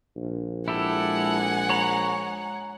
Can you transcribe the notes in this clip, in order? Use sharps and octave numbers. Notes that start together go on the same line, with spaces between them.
A#1
G#3 E4 G4 A4 F#5 G#5
C#5 A#5 B5